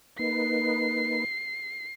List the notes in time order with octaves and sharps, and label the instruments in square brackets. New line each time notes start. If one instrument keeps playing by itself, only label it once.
[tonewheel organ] A#3 D#4 B4 [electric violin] C7